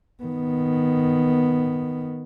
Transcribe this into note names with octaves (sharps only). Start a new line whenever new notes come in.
D#3 B3